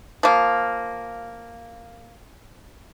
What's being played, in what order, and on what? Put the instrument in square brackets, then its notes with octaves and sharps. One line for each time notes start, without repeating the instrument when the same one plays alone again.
[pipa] F3 A#3